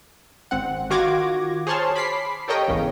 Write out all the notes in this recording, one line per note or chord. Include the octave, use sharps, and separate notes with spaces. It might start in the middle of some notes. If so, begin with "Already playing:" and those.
G#1 C4 F#5
D#3 F4 F#4 D6 G#6 A#6
G#4 C5 C#5 A5 C6 F6
B5 D6 B6 C7
G4 A4 A#4 C#5 D#5 G5
G#1 E2 C#3